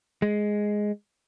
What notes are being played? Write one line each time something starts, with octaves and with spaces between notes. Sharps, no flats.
G#3